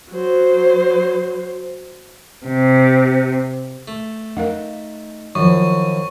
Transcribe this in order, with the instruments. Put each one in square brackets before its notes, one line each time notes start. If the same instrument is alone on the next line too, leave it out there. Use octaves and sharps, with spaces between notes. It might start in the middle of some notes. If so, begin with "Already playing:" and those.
[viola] F#3 C5
[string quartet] C3
[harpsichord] A3
[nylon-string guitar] D#4 [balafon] A#4 F5 F#5
[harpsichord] F#2 [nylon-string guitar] D#3 F3 [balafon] F#3 [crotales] C#6